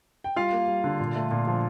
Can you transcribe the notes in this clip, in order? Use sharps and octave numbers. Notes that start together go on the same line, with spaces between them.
G5
G3 F4 F5
A#3
G3
D3
A#2
A3
A#2
F3